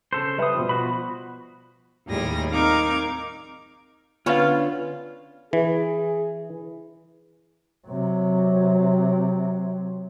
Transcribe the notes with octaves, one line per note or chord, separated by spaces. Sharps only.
C#3 A4 C5
G3 B4 C5 E5 D#6
B2 F3
F4 F#4 B5
D#2 A2 F3 G3 G#4 A#6
C4 D#4 A#4 F5 D6 G#6
D3 B3 C#4 F4 F5
E3 G#4
C3 F#3